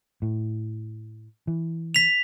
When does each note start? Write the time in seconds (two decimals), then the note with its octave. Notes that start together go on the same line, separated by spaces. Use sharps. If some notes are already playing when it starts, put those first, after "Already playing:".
0.22 A2
1.47 E3
1.95 B6 F7